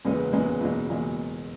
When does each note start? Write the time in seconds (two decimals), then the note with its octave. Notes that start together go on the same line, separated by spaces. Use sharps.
0.05 F#1 E2 C#3 G#3 B3
0.33 F#1 E2 C#3 G#3 B3
0.60 F#1 E2 B2 G#3
0.89 F#1 E2 B2 G#3